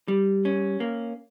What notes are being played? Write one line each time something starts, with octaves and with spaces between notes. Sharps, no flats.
G3
C#4
A#3